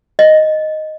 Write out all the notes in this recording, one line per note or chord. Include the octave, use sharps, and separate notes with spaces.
D#5